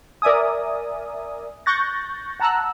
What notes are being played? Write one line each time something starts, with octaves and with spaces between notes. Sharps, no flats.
A#4 D5 E5 G#5 D#6
C#6 F#6 G6 A6 A#6
F#5 A5 A#5 E6 F#6